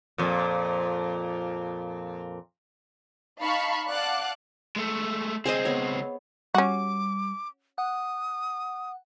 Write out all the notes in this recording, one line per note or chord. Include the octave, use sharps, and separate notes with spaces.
F2 A#2
D#4 F5 A5 B5 C#6
D5 F5 F#5 A5 D6 F#6
G#3 A3
C#2 C4 G#4 C5 D#5
B3 C#5
G3 C#4 F#4 D6
F#5 D#6